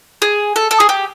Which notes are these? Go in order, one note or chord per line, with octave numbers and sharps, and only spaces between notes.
G#4
A4
A4
G#4
G4